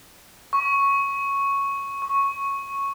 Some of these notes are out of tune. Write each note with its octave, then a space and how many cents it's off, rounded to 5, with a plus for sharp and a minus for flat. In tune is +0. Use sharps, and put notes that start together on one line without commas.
C#6 -5
C#6 -10